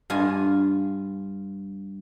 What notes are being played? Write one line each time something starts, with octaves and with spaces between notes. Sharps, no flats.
G2 F4 G#5